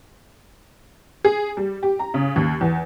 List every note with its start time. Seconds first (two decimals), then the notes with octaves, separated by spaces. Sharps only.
1.25 G#4
1.57 G3
1.83 G4
1.99 A#5
2.14 C#3
2.36 D#2
2.61 E2